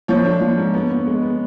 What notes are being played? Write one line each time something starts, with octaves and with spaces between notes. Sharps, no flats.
F3 C#5
D4
F3
G#2
B3
B3
G#3
B3